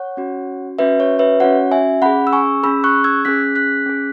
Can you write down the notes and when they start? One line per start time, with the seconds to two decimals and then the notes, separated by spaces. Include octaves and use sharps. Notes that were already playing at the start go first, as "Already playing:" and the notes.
Already playing: C#5 F#5
0.17 C#4 F#4
0.79 C#4 F#4 B4 E5
1.00 C#5
1.19 B4 E5
1.40 C#4 F#4 C#5 F#5
1.71 E5 G#5
2.02 C#4 G#4 F#5 B5
2.27 E6
2.33 G#5 C#6
2.63 C#4 G#4 B5 E6
2.84 C#6 F#6
3.04 E6 G#6
3.25 C#4 G#4 F#6 B6
3.55 F#6 B6
3.86 C#4 G#4